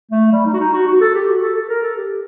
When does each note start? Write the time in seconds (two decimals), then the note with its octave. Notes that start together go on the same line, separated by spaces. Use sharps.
0.11 A3
0.32 G3
0.46 D#4
0.54 F#4
0.59 D#4
0.73 F#4
0.87 F#4
1.00 A4
1.14 G4
1.28 F#4
1.41 A4
1.56 A4
1.69 A#4
1.83 A4
1.97 G4